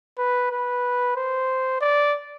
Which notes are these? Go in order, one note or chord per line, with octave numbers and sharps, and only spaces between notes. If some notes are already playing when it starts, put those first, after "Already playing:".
B4
B4
C5
D5